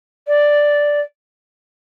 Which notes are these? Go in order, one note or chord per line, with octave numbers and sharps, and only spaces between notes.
D5